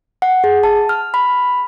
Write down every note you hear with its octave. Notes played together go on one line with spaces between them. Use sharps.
F#5
G#4
A5
F6
B5